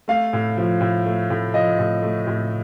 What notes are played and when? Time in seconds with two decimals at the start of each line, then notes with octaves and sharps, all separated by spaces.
0.08 A3 F5
0.33 A2
0.57 F3
0.81 A2
1.06 A3
1.30 A2
1.54 F3 D#5
1.79 A2
2.02 A3
2.27 A2